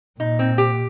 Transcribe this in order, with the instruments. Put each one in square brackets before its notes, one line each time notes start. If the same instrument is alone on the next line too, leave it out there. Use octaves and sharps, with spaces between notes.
[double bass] A#2 [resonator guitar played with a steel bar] D#4
[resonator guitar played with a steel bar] C4
G4